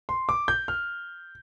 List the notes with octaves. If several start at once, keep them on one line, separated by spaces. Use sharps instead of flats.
C6
D6
G6
F6